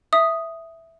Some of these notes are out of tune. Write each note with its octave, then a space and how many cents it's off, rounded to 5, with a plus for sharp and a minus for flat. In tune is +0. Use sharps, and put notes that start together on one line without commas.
E5 +0 D#6 +0